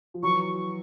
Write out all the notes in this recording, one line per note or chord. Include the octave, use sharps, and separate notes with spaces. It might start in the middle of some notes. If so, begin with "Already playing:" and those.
F3
E3 F#3 C#6